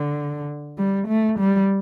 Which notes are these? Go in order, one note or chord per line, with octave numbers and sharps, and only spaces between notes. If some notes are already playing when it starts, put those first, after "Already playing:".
Already playing: D3
G3
A3
G3